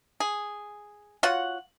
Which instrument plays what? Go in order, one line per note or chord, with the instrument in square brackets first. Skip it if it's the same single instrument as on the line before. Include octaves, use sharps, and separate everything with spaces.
[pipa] G#4
F4 F#4 C#5 F#5